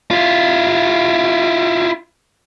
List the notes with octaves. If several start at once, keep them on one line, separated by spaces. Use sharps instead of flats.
E4 F4